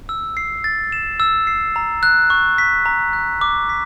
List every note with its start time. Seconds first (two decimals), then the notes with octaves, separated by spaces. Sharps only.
0.09 E6
0.37 C7
0.64 A6
0.92 E7
1.20 E6
1.47 C7
1.76 A#5
2.03 F#6
2.30 C#6
2.58 B6
2.86 A#5
3.13 F#6
3.41 D6
3.69 B6